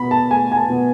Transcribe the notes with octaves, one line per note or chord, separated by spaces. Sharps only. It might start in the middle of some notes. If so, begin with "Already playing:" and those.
Already playing: B2 B5
A5
A3 G#5
G#5
A5
B2